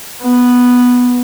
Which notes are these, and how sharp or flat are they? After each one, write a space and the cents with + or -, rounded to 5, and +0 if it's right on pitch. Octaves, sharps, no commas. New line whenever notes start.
B3 -5